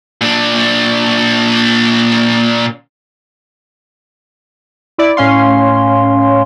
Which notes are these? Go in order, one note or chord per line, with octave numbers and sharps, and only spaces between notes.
A#2 D4
E4 D5
A2 C#4 F5 C6